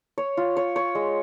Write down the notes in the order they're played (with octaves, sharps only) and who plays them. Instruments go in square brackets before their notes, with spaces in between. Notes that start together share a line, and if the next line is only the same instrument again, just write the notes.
[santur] C#5
F4
C#5
C#5
G#3